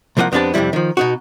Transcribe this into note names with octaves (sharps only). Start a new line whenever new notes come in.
C2 F3 A#3 D#5 F#5
F2 B3 C4 D4 G4 A5
F2 C3 E3 G3 E4
D#3 F3
B2 D#4 F#4